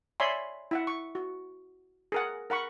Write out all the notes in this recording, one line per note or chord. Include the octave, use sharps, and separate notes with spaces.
C#5 D5 E5 G#5 B5 C6
E4 E5 F#5
C#6
F#4
G#4 A#4 F#5
A#4 F#5 B5 C#6